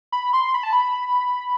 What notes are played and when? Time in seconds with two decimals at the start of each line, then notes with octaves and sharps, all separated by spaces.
0.12 B5
0.33 C6
0.54 B5
0.63 A5
0.73 B5